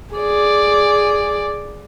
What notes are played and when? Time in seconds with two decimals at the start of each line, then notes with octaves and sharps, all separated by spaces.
0.15 G#4 D5